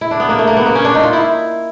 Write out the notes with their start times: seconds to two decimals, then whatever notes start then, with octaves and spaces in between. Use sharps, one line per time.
0.01 E4
0.11 D4
0.20 B3
0.29 A#3
0.38 A3
0.47 A#3
0.57 B3
0.66 A#3
0.75 C#4
0.85 D4
0.95 D#4
1.03 F4
1.13 E4